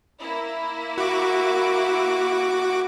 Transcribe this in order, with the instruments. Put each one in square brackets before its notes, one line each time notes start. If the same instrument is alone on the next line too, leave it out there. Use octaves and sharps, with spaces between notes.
[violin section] A#3 E4
[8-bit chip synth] F#4 D6